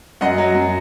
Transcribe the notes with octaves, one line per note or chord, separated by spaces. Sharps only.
F#2 D#5 F#5
F#3
F#2